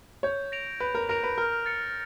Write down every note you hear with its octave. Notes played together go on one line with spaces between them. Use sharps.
C#5 G6
A#6 D7 F7
B4 G6
A#4
A#4 A#6 D7 F7
B4
A#4 F6
A6 C#7